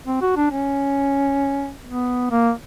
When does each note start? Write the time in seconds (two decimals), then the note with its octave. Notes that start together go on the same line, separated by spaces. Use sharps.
0.07 C4
0.22 F#4
0.37 D4
0.51 C#4
1.87 B3
2.31 A#3